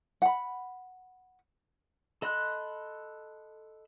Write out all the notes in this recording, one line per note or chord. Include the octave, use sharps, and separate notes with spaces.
F#5 B5
A4 D#5 B5 C6 F#6